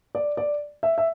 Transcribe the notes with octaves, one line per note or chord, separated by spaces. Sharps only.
D5
D5
E5
E5